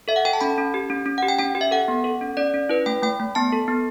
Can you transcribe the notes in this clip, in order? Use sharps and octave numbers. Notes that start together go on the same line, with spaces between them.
A4 E5
F#5
A4 G5
A5
C#4 B5
C#4
G4
C#4
C#4
G4 F#5
G5
C#4 G5
G4
E5
A4 F#5
B3
A4
C#4
C#4 D5
C#4
E4 B4
A3 G5
A3 G5
A3
B3 A5
A4
B3